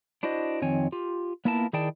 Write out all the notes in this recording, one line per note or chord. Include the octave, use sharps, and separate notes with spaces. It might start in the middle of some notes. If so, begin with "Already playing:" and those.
D4 E4 F#4 C5 D#5
F2 D#3 C4 C#5 G#5
F4 G4
A#3 B3 E4 F4 A#4 A5
D#3 E4 G#4 D5 G5 A5